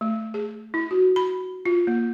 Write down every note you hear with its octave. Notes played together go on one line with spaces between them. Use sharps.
A3
G#4
E4
F#4
B5
F4
A#3